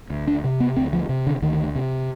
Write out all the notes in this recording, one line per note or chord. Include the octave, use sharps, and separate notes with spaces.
D2
D4
C3
B3
D2 C4
F3
C3
D3
D2 D#3
C3